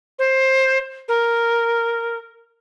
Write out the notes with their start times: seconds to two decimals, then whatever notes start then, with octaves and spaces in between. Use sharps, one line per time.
0.19 C5
1.08 A#4